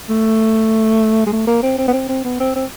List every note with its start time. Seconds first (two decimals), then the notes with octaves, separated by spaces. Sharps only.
0.09 A3
1.26 G#3
1.33 A3
1.47 A#3
1.63 C4
1.78 C4
1.88 B3
1.93 C4
2.09 C4
2.24 B3
2.40 C4
2.55 C4